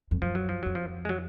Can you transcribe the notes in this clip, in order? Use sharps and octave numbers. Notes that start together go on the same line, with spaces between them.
F2
F#2 F3
F#3
F3
F2 F#3
F3
G#3
F#3